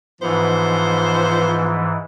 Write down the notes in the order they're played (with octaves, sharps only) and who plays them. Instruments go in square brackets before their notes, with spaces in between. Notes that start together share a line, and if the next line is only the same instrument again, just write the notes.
[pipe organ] G#2 E3 [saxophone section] F3 B3 [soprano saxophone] C5